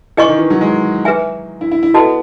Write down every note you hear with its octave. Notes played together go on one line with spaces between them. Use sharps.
E3 G#4 D#5 G#5 C#6
D#3
E3
F#3
G#3
G#4 B4 E5 G#5
E4
E4
E4
B3 F#4 A4 D#5 A5